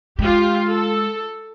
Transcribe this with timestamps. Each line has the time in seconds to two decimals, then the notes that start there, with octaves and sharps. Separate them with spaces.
0.19 G#3 F4 G4
0.68 A4